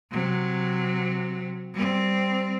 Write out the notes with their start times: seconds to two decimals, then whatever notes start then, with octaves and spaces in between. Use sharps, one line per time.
0.11 C3 F#3
1.73 G3 C4